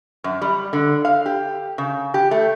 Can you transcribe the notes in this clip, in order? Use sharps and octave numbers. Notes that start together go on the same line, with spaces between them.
F#2
G3
D3
F5
G4
C#3
G4
A3